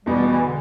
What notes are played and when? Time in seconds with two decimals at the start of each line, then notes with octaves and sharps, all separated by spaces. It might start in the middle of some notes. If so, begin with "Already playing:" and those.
0.06 E2 B2 G3 B3
0.26 E3
0.46 D3